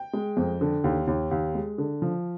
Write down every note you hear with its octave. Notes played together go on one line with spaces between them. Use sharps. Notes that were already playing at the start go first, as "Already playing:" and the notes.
Already playing: G5
G#3
F2
D3
D#2
D#2
D#2
G#3
D3
F3